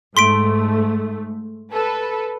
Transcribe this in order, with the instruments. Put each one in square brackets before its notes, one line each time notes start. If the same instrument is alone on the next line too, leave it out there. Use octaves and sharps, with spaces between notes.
[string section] G#2 A3 [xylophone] C6 B6 D7
[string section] A4 B4